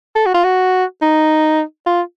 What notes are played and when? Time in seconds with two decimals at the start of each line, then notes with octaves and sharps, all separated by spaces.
0.16 A4
0.26 F#4
0.35 F4
0.44 F#4
1.02 D#4
1.86 F4